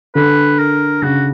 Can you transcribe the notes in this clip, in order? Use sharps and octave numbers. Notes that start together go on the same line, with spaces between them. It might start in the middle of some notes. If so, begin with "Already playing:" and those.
D3 B4
A#4
C#3 F#4